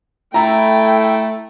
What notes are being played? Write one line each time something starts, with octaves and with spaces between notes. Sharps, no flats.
A3 E4 G5 A#5